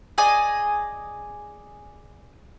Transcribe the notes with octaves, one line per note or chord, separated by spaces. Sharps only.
G#4 D5 D#5 G#5